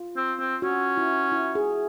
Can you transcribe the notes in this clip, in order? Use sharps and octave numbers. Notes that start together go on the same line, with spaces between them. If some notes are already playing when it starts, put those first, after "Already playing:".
Already playing: F4
C4
C4
C#4 F#4
E4
E4
G#4